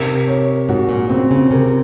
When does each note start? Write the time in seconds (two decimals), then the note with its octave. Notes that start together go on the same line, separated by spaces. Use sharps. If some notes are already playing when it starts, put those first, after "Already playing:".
Already playing: C3 A#4
0.28 C#5
0.69 G#2 F#4
0.89 A#2
1.10 C#3 C4
1.31 C#3
1.51 C3 A#4